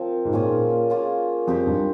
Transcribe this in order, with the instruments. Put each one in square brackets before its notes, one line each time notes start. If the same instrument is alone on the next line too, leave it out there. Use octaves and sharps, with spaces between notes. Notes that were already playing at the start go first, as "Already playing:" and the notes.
Already playing: [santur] F3 C4 F4 A#4
[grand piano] G#2
[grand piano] A#2 [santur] A#3 C#4 F4 G#4
[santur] A#3 C#4 F4 G#4
[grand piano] F2 [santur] C4 G4 C5
[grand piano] G2